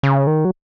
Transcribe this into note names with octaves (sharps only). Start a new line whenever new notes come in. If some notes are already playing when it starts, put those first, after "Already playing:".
C#3
D#3
F#3